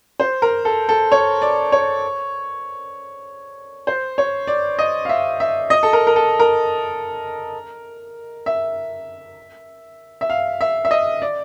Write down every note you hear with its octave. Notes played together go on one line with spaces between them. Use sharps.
C5
A#4
A4
A4
C#5
D5
C#5
C5
C#5
D5
D#5
F5
E5
E5
D#5
A4
A#4
A#4
A4
A#4
E5
E5
F5
E5
E5
D#5
D5